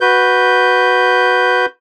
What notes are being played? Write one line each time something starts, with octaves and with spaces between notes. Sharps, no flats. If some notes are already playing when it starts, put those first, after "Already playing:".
F#4 B4 G6